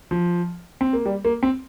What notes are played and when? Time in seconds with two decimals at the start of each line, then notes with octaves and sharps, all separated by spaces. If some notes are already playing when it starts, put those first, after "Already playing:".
0.11 F3
0.81 C4
0.93 A#3
1.06 G3
1.25 A#3
1.43 C4